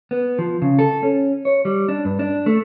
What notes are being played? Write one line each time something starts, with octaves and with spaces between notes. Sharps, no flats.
B3
F3
C#3
A4
C#4
C#5
G3
D4
G2
D4
A3